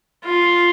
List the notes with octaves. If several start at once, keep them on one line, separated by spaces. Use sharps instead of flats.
F4